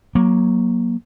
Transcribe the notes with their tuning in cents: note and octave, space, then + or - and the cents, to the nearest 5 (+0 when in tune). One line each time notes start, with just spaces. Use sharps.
F#3 +0 A#3 +15